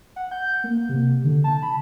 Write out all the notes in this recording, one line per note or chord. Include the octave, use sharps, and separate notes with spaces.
F#5
G6
A#3
C3
D3
A5
B5